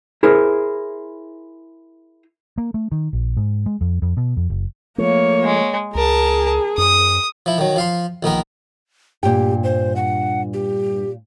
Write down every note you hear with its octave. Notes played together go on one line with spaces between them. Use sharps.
E4 G#4 A#4 C5
A#3
A3
D#3
A#1
G#2
G#3
F2
F2
B2
F2
F#1
F3 A3 A#3 C#5
G#3
C#2 G#4 A#4 A5
F#2 D#6
F3 E4
D#3 F#3
F3 F5 C6
A#1 D#3 B3 A#4
G2 A#2 G4 G5
C5
F#5
G4